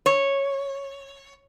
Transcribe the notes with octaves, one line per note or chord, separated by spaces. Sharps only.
C#5